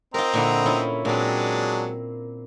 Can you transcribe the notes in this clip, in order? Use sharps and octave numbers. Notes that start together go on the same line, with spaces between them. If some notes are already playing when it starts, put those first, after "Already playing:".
C4 F4 A#4 D#5 A#5
A#2 D3 E4
C#4 E4 F4
A#2 F#3 G#3 A#3 C4 D4